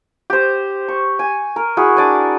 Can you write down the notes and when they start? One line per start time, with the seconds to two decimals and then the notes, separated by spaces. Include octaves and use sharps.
0.30 G4 C5
0.88 C#6
1.19 G#5
1.56 A#4
1.77 E4 F#4 G#4
1.97 D4 D5 G#5